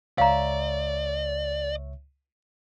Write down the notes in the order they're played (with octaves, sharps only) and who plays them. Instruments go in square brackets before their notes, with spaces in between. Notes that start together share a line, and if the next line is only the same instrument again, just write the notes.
[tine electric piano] C#2 C#5 E5 [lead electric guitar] D5 [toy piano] F5 A#5